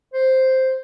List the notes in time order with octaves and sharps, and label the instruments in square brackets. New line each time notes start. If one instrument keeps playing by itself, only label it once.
[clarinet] C5